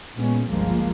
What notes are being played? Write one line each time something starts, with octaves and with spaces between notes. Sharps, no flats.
A#2 G#3 B3 C#4
G1 C#2 G2 F3 G#3 A#3